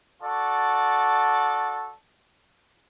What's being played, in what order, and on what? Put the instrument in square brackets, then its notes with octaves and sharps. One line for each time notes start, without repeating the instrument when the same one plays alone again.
[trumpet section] F#4 A4 D5